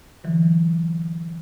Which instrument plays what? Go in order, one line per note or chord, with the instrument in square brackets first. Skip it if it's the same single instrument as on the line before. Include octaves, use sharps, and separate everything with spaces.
[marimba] D3 E3 F#3